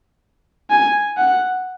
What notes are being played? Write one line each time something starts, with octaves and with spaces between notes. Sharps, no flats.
G#5
F#5